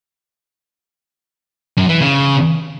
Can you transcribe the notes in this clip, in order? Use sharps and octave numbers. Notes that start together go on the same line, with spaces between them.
F#2
E3
C#3